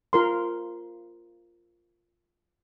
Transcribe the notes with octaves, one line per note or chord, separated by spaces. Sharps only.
F4 A#4 C6